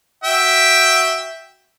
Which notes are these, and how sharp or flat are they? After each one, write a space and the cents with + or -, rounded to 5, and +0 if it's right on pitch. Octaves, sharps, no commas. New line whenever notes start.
F#4 +0 E5 -5 G5 +5